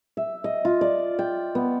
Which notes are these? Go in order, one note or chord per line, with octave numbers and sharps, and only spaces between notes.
E5
D#5
F4
D5
G5
B3